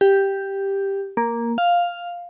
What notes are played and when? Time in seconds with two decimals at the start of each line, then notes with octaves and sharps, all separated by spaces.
0.01 G4
1.17 A#3
1.58 F5